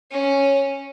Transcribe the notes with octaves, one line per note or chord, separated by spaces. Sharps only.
C#4